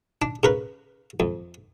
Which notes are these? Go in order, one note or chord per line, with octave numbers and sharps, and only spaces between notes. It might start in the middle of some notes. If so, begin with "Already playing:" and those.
D4
C#3 A#4 B4
F2